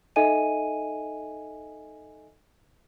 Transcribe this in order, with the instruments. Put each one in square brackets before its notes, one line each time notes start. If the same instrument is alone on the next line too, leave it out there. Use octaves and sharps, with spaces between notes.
[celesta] D#4 A4 D#5 E5 G#5 D#7